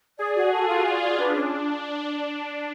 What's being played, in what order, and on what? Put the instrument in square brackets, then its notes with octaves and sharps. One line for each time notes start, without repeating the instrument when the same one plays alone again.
[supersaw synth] G#4 [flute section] D5
[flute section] F#4
A4
[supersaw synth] F4 [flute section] F#4
[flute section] D5
F#4
[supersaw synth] D4 [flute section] B4
[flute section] C#4